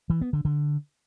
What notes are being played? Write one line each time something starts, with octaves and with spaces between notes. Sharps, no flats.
E3
B3
D3
D3